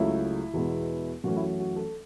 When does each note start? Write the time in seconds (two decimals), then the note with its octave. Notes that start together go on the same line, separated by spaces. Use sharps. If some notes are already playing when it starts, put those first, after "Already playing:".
Already playing: C#2 C#3 F#3 A3 E4
0.53 E2 B2 G#3 B3
1.24 F#2 E3 A3 C#4 F#4
1.36 E4
1.41 F#4
1.59 F#4
1.76 A4